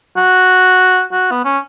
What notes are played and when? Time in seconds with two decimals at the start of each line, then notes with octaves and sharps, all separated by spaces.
0.17 F#4
1.12 F#4
1.31 B3
1.45 C#4